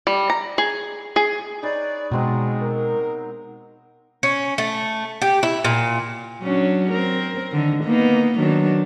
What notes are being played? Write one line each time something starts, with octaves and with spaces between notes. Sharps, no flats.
G3
A#5
G#4
G#4
D#4 B4 C#5 D5
B2 F#3 G#3 C4 D#4
A#4
C#4
A3
G4
E4
A#2
F#3 C#4 D4
C4 A#4
D3 D#3
A#3 B3 D#4
D#3 F#3 D4